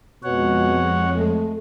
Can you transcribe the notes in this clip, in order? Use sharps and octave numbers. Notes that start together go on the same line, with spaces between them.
F2 B2 G#3 C#5 F#5
A3